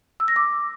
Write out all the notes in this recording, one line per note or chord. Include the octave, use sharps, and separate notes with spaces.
E6
A#6
D6